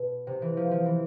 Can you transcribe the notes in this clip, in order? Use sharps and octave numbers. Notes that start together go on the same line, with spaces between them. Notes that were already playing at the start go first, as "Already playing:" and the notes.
Already playing: B2
C3
E3
F3
F3
E3